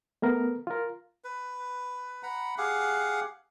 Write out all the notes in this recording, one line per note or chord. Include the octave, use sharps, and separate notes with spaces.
A3 B3 A#4
F4 A#4
B4
F#5 A#5 B5
G4 G#4 F5 F#5